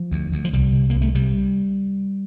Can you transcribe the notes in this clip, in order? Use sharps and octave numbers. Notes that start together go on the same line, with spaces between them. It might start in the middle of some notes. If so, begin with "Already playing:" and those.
Already playing: F3
D2
D2
F3
C2 G3
C3
C2 A#3
A3
C3 G3